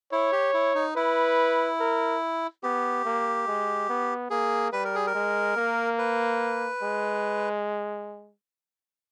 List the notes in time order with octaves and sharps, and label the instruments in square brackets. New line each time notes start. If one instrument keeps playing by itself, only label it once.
[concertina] E4 [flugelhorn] C#5
[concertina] G4
E4
D#4
[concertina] E4 [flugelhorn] B4
[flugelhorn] A#4
[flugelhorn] B3 [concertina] G4
[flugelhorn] A#3
G#3
B3
[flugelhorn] A#3 [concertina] G#4
[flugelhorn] G3 [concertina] B4
[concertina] A#4
G#4
A#4
[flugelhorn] G#3
A#3
[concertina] B4
[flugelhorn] G#3